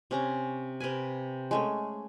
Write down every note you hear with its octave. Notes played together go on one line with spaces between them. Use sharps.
C3 C#4 A#5
C3 A#4 B4 G#5
G#3 A3 C#4